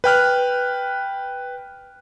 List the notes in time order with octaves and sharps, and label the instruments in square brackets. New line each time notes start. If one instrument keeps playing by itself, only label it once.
[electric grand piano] B4 G5 F6 F#6